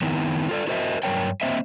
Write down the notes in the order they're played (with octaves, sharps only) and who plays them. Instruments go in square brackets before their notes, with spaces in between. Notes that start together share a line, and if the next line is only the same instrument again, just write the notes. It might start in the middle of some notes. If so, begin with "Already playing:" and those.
[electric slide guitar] D#3 B3 C4 D#4 E4
F4 A4 D5
E4 F#4 A#4 C5 D#5 E5
G2 F#3 A#4 C#5 G5
A#3 C4 C5 D#5 E5